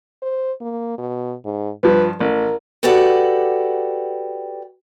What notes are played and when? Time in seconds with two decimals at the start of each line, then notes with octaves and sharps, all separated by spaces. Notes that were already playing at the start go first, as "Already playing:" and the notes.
0.22 C5
0.61 A#3
0.98 B2
1.45 G#2
1.83 G2 F3 B4
2.20 A1 A#4
2.83 F#4 G4 A4 B4 D5 F#5